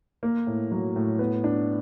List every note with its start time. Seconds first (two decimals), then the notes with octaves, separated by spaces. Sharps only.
0.23 A#3
0.47 A2
0.72 F#3
0.96 A2
1.19 B3
1.44 D4